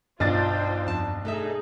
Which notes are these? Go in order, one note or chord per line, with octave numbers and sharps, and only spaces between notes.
B1 G2 D4 F4 C5 D#5 G5 A6
F2 A5
A3 D#4 G#4 A4 E5